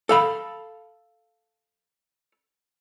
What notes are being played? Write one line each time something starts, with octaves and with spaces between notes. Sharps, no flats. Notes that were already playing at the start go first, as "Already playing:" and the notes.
A4 F5 B5